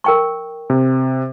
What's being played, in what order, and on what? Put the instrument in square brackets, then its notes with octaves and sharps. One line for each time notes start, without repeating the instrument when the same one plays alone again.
[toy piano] A#4 G5 C#6
[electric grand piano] C3